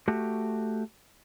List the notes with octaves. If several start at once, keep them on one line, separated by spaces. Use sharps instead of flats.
A3 F#4 G4